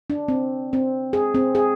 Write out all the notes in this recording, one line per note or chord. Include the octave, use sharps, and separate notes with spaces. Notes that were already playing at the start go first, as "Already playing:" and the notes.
D4
C4
C4
G#4
C4
G#4